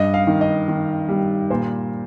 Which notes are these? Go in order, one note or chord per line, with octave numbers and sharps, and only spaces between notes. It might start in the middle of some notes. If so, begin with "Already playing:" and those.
Already playing: G2 D#5
F5
D#3
D#5
D#3
G3
A#2 C5